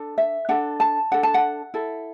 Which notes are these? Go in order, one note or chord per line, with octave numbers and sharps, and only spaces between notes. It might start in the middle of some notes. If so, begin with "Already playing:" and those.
Already playing: D4 A4
E5
D4 A4 F#5
A5
D4 A4 F#5
A5
F#5
E4 A4